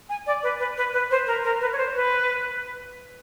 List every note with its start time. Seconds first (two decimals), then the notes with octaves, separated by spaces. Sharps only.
0.09 G#5
0.27 D5
0.43 B4
0.59 B4
0.77 B4
0.93 B4
1.11 C5
1.27 A#4
1.44 A#4
1.61 B4
1.73 C#5
1.78 C5
1.95 B4